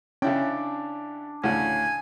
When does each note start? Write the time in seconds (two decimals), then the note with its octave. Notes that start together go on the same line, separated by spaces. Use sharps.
0.22 C#3 C#4 D4 E4 G5
1.44 D2 A2 C#3 G#5